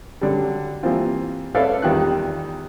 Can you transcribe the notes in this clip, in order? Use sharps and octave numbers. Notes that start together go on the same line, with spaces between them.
D3 F#3 G3
E3 F3 G3 A#3 C4 F4
A4 B4 C#5 D5 E5 F5
E2 D#3 G3 F4 G4 F#6